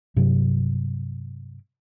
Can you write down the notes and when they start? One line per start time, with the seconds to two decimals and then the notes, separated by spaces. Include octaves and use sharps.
0.16 G2 C3 F#3